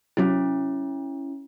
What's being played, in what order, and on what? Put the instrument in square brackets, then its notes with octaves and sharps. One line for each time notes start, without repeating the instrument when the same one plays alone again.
[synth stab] C3 F#3 [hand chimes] C#4 E4